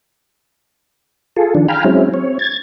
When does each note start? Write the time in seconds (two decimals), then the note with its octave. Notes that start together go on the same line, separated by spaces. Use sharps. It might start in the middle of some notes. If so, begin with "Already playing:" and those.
1.36 F4 G#4 A4
1.55 D#3 F3 D4
1.68 F5 G5 G#5 A#5 B5 F6
1.84 F#3 G#3 C4 C#4 E4
2.14 C4 C#5
2.39 G#6 A6